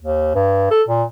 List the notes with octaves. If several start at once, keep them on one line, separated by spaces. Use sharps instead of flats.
D#2
G2
A4
A#2